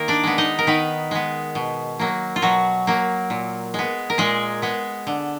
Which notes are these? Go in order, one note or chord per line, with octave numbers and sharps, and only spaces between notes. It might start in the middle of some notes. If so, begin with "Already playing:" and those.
Already playing: D#3 A#3 A#4
D4 D5
G#3 B3
D#4 D#5
A#4
D#3 B3 B4
G#3 B3
B2
F#3 A#3
F4
B2 F#3 F#4
F#3 A#3
A#2
G#3 B3
A#4
A#2 G#3 G#4
G#3 B3
D3